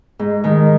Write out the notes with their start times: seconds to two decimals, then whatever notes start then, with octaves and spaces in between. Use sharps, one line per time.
0.19 G#2
0.44 D#3 G#3